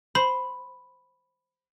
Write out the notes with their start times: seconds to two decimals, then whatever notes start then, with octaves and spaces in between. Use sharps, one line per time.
0.15 C5 B5